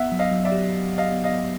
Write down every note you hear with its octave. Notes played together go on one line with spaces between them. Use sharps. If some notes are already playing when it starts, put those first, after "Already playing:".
Already playing: B3 E5 F#5
F#3
D#5 F5
F#3
D5 E5
G4
G4
F#3
D#5 F5
B3
D#5 F5
B3